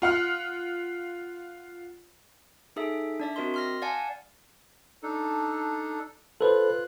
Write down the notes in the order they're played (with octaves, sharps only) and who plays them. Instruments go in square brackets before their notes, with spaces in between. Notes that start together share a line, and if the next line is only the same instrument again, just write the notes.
[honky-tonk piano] F4 F#5 F6
[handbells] D#4 G#4 A4 E5
D4 D5 E5
C4 F#4 A#4 D#5 C6
C6 F6 A#6
D5 F5 F#5 G#5 A5
[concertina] D4 D#4 A4
[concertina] F4 F#6 [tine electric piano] A4 B4 C5